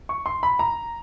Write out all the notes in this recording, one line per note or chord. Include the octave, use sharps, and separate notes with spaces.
C#6
C6
B5
A#5